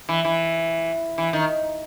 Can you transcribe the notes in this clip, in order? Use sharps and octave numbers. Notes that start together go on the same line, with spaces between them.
E3
E3
E3
D#3